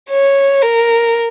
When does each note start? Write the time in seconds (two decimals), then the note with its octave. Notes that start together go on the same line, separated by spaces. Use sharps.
0.10 C#5
0.62 A#4